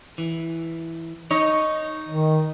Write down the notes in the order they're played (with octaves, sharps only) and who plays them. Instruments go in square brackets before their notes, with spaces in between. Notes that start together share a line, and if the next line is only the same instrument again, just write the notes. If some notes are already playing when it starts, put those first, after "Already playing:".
[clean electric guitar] E3
[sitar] D#4 [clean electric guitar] C#5
[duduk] D#3